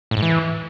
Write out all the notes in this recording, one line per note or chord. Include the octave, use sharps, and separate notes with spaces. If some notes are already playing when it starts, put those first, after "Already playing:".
A2
G#2
E3